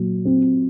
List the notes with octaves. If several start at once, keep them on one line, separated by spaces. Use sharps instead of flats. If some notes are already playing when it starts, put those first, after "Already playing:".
Already playing: A#2 F#3
C4